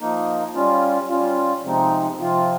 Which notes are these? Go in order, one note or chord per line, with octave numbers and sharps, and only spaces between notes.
F3 A#3 D#4
G3 C#4 F4
G3 C#4 F4
C3 F3 G#3 C4 D#4
C3 F3 C4 F4